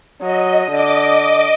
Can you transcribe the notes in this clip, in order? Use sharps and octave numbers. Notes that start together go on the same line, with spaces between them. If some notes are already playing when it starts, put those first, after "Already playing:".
F#3 D#5
D3 D#5 D6